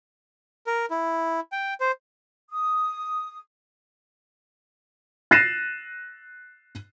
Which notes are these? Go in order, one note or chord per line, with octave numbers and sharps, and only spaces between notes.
A#4
E4
G5
C5
D#6
F#6 A6 A#6 C7 D#7 E7